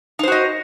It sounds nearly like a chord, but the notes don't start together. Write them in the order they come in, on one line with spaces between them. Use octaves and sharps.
D#4 C5 F#4 D#5